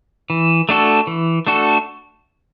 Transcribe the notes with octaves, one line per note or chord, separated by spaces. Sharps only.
E3
A3 D4 F#4 A4
E3
A3 D4 F#4 A4